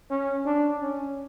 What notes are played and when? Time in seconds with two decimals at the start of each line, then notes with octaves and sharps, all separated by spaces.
0.10 C#4
0.46 D4
0.81 C#4